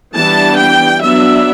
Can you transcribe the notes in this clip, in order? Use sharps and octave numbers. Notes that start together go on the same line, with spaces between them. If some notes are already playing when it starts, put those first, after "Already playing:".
E3 G3 B3 D4 A5
G5
F#3 B3 D4 E5